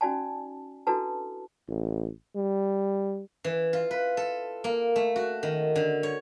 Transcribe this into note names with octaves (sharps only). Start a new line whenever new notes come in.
C#4 D#4 F#4 D5 G#5 A5
D4 E4 F#4 A4 B4 A5
A1
G3
E3
F4
B4
A4
A#3
A3
F#4
D#3
D3
C#5